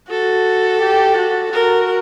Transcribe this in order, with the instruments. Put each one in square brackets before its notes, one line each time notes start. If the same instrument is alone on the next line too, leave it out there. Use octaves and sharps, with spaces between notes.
[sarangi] F#4 [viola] A4
[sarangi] G4
F#4
[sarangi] F#4 [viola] A#4